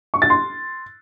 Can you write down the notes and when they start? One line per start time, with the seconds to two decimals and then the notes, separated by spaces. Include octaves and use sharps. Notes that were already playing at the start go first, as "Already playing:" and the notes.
0.14 C#6
0.22 A6
0.30 C6